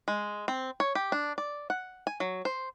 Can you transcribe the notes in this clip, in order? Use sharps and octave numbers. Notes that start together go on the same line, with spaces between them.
G#3
C4
C#5
G4
D4
D5
F#5
G#5
F#3
C5